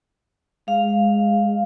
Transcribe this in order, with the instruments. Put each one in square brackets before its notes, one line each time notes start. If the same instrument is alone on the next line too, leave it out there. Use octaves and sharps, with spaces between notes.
[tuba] G#3 [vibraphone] F5